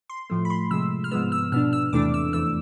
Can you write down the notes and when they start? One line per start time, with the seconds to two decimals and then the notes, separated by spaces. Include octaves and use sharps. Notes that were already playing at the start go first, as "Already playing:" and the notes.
0.09 C6
0.30 A2 F3 A3
0.45 B5
0.50 C6
0.71 C3 F3 G#3 E6
1.04 F6
1.11 G#2 F3 G#3 B3 E6
1.32 E6
1.52 B2 B3 D4 F6
1.73 E6
1.93 E2 C3 E3 A3 D4 D6
2.14 E6
2.33 F2 E3 A3 E6